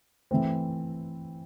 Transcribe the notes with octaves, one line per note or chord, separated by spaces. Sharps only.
E3 A3 C4